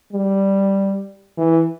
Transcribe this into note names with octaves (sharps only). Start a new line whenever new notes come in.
G3
E3